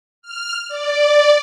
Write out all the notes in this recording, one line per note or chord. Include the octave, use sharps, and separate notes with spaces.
F6
D5